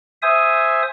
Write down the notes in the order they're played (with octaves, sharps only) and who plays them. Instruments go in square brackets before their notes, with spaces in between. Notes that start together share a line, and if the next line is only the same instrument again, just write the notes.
[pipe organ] C5 E5 G#5 D#6